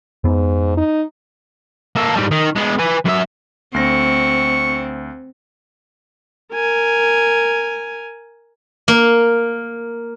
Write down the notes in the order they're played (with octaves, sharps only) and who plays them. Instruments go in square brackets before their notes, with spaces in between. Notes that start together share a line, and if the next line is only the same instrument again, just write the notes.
[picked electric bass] F2 B3 [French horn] G#2
[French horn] D#4
[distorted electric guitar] A#3 A4
G#2 G3
D#3
G#3 B3
B4 G#5
F#2 E5
[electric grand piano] D2 A#6 [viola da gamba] C4 [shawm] C#6
[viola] A#4 G#5
[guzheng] A#3